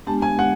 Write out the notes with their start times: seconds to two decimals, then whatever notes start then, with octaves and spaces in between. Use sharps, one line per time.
0.07 G#3 B3 D4 G4 A5
0.22 G#5
0.39 F#5